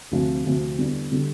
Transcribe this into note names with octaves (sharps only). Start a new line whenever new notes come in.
D2 C3 F3 C4
D2 C3 F3 C4
E2 D3 G3
D3 G3